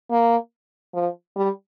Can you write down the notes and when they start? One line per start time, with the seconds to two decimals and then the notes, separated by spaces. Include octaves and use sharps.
0.11 A#3
0.94 F3
1.36 G3